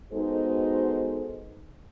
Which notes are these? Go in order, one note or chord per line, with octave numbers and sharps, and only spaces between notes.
G#3 B3 D#4 F#4 A4 C5